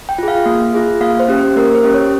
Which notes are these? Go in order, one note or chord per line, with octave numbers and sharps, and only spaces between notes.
G5
F4 G#4
F5
A#3
F4 G#4
A#3 F5
C5
C#4 G4
C5
A#3 A#4
C5
C#4 G4
C#5